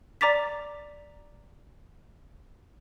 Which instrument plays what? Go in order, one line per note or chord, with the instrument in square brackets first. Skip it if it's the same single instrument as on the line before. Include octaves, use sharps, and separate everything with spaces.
[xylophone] D5 A#5 D6 A6 B6